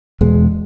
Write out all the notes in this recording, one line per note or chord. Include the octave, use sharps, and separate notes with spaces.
E2 B2 G#3